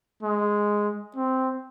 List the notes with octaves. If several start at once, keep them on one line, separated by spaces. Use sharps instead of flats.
G#3
C4